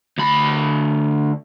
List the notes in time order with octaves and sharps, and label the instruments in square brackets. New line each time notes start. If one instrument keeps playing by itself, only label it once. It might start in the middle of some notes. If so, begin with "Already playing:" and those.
[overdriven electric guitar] D2 B5